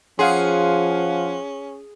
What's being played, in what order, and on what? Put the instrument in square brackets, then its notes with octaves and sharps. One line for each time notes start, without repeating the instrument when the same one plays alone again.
[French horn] F3 [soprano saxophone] C#4 [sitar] G#4 [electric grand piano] F5 F#5 C6